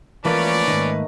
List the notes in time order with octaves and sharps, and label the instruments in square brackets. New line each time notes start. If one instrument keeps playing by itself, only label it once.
[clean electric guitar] E3 F3 [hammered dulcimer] A3 A#3 A#4 [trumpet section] C#4 D5 [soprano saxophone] B4
[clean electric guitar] G#2 D#3 [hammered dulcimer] D#5